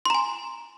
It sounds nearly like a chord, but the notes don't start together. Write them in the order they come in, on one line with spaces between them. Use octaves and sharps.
C6 A#5 G#5